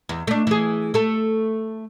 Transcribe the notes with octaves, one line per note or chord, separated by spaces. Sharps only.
E2
A3 D4
E3 G#4
A3 A4